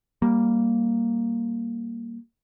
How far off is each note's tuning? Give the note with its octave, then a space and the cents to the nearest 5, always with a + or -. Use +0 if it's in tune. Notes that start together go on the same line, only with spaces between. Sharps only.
G3 +0 A#3 +0